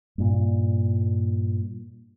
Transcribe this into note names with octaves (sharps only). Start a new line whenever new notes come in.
G2 A#2